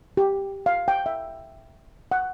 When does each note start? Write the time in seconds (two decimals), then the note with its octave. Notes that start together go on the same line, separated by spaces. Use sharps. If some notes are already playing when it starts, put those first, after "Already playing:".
0.17 G4
0.66 F5
0.88 G5
1.06 E5
2.11 F#5